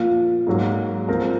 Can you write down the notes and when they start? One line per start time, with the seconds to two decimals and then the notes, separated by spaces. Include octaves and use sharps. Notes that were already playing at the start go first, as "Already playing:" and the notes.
Already playing: A#2 F3 A#3 F4
0.47 G#2 F#3 A#3
1.08 F3 C4 F4 A#4